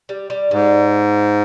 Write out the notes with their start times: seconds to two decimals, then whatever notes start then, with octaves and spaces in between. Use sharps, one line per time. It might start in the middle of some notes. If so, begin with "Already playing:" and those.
0.09 G3
0.30 G3
0.51 G#2 G3